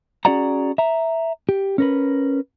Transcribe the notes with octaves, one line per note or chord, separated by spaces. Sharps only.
C#4 F#4 G#4 D5 F#5 A#5
E5 A#5
G4
C#4 A#4 B4